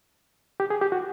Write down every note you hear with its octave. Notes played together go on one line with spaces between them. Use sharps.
G4
G#4
G4
F#4